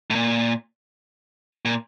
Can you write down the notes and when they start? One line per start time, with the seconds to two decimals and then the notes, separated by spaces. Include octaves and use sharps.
0.10 A2
0.15 A#2
1.65 A#2